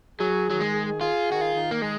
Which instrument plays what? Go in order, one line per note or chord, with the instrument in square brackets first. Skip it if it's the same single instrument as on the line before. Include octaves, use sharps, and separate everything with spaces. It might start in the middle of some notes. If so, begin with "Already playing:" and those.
[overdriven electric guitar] F#3 [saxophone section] G#4
[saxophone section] D#3 [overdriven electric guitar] F#3
[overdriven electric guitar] G#3
[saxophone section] G#4
[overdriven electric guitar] F4 [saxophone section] G#4
[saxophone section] D#3 [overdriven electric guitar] F#4
[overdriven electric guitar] F4
[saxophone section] D#3
[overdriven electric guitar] A#3
[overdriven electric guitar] G#3 [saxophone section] G#4